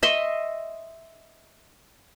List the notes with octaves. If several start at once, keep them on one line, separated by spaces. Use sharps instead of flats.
D#5 E5 C6 C#6